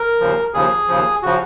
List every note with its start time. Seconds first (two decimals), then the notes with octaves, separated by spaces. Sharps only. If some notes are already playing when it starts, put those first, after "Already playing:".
Already playing: A#4
0.20 D#2 C#3 F3
0.54 D#2 C#3 F3 G#4
0.88 D#2 C#3 F3
1.22 C#3 F3 F#4